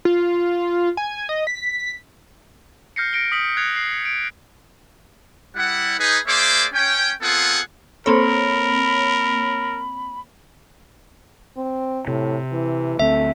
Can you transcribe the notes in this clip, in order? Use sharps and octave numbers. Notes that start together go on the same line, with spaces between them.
F4
G#5
D#5
B6
F6 G6 A#6 C7 C#7
A#6 C#7 D7 G7
D#6 B6 F#7
F#6 G#6 C7 C#7 F7
C7
D7
G3 E4 F#5
D#4 G#4 B4
A#3 G#4 C5 D5 E5 D6
C#4 G5
B3 C4 F4 G#4 A4 F#5
A#3 C4 A4 A#4 C5 C#5 B5
C4
A2 C3
E3
D2 A3 C4 E5